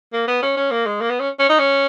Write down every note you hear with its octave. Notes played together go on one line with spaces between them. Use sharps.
A#3
B3
C#4
C#4
A#3
G#3
A#3
B3
C#4
C#4
D#4
C#4